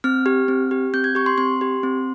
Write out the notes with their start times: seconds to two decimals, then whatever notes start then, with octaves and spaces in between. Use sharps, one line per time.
0.04 C4 F6
0.26 G4
0.48 C4
0.71 G4
0.94 C4 G6
1.04 G#6
1.15 G4 C#6
1.26 C6
1.38 C4 C6
1.61 G4
1.83 C4